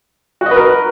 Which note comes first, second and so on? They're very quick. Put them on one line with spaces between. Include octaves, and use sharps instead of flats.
F#4 D#5 B4 A#4